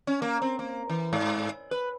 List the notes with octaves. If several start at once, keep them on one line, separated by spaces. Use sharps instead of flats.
C#4
A#3
C4
A#3
E3
G#2
B4